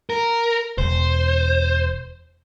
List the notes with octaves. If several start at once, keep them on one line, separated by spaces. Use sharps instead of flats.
A#4
E1 C5